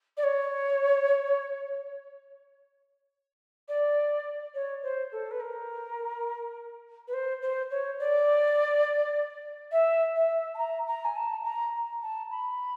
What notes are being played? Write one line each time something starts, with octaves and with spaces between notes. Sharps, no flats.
D5
C#5
D5
C#5
C5
A4
B4
A#4
B4
C5
C5
C#5
D5
E5
E5
A5
A#5
A#5
G#5
A5
A#5
A5
B5